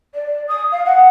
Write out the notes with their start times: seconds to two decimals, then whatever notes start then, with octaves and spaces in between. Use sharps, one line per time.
0.15 D5
0.48 D#6
0.72 F5
0.86 F#5